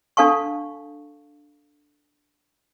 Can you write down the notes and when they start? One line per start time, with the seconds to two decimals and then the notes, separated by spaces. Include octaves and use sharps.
0.17 D4 A4 F5 A5 C#6